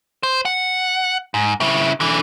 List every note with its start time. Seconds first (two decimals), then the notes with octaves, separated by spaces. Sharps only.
0.23 C5
0.45 F#5
1.34 G#2
1.60 C#3 E4
2.00 D3 E3